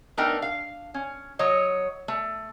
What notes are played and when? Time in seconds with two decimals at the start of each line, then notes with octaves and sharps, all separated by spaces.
0.17 A3 B3 D4 D#4 A#4 G5
0.42 F5
0.94 C#4
1.39 F#3 C#5 D#5
2.08 A3